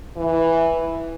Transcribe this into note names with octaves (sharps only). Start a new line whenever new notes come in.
E3